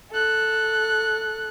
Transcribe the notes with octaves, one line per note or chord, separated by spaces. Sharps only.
A4 F#6